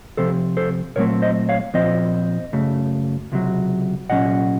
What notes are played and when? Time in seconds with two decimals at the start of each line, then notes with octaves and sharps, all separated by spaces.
0.17 C3 F3 C4 A4 C5
0.57 A4 C5
0.96 A#2 F#3 A3 C4 A#4 C#5
1.22 C5 D#5
1.49 C#5 F5
1.74 A#2 F3 C4 C5 D#5
2.53 F#2 C#3 A3
3.32 C#2 C3 F#3
4.10 C2 A#2 F#3 C#4 D#5 F#5